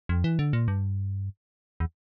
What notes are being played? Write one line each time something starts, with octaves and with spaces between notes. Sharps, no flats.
F2
E3
D3
A#2
G2
E2